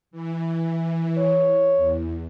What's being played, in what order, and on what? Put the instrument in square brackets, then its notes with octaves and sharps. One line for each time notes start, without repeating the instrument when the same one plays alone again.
[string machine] E3
[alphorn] C#5
[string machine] E2